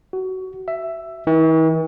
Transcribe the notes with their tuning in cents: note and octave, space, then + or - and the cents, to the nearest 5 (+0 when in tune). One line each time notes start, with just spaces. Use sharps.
F#4 +20
E5 +10
E3 -45